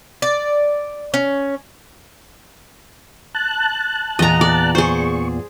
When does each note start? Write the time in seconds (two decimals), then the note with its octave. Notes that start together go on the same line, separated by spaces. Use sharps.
0.22 D5
1.14 C#4
3.35 A5 F#6
4.19 E2 A#2 D#5 A#5
4.41 D5
4.75 G#4 C5 C#6